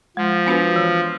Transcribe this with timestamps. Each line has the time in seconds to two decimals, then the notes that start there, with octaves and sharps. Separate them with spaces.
0.17 F3 G#3
0.46 B3 D4 F#4 B4
0.76 E3